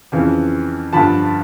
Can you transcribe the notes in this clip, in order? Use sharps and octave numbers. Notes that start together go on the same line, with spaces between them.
F2 C#3 E3
G2 D3 F3 A5 B5